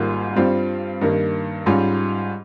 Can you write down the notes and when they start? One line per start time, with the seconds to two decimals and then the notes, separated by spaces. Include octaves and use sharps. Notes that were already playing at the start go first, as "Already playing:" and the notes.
Already playing: G#1 G#2 G3 A#3 F4
0.36 G2 G3 C4 F4
1.01 G2 D#3 A#3
1.66 G#2 G3 C#4 F4